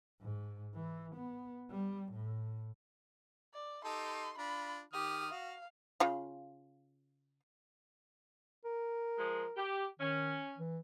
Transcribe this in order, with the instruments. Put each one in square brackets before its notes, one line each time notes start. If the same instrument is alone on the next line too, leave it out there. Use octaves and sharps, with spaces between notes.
[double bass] G#2
E3
B3
G3
A2
[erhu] D5
[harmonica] D#4 G4 A4 [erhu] C6
[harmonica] D4 F4 [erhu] B5
[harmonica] D#3 D#6 F6 [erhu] G4
[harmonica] F#4 [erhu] F5
[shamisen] C#3 F4 F5
[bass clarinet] A#4
[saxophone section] F3 G#3
G4
[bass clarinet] D#3 [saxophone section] C#4
[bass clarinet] E3